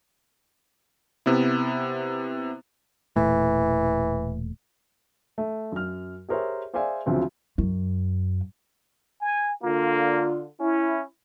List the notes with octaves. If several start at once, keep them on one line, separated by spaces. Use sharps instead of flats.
C3 B3 E4
E1 A#2 E3 A3
A3
F#2 F6
G4 G#4 A#4 C5 C#5 E5
G#4 C5 D5 E5 F5 G#5
D2 C#3 F3 F#3 C4
F#2
G#5
D3 A#3 F4
C#4 E4